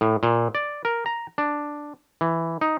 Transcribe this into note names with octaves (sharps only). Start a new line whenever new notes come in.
A2
A#2
D5
A#4
A#5
D4
E3
D#4